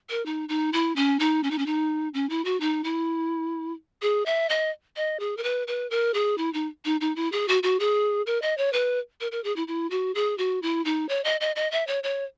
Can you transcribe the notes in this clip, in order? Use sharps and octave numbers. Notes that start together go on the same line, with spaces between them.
A#4
D#4
D#4
E4
C#4
D#4
C#4
D#4
C#4
D#4
C#4
E4
F#4
D#4
E4
G#4
E5
D#5
D#5
G#4
A#4
B4
B4
A#4
G#4
E4
D#4
D#4
D#4
E4
G#4
F#4
F#4
G#4
A#4
D#5
C#5
B4
A#4
A#4
G#4
E4
E4
F#4
G#4
F#4
E4
D#4
C#5
D#5
D#5
D#5
E5
C#5
C#5